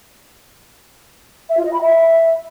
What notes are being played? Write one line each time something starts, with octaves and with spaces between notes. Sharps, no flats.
E5
F4
D#5
B5
E5